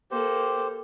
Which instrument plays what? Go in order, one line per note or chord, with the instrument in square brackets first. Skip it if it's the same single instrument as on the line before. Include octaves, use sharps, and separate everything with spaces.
[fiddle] A#3 A4 [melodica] G4 C5